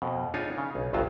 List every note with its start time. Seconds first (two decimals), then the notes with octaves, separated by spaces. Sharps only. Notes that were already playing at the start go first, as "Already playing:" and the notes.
0.02 F2 B2
0.34 D4 D#4 F4 G#4 C#5
0.58 C#3
0.75 B1
0.93 G1 C2 G2 F#3 F4 A5